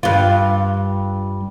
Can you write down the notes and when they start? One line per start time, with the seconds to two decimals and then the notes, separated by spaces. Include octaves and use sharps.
0.03 G2 F4